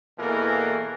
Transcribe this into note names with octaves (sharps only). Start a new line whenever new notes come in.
E2 B2 E3 A#3 A4 A#4